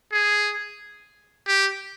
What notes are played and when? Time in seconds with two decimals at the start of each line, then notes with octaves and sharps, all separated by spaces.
0.12 G#4
1.48 G4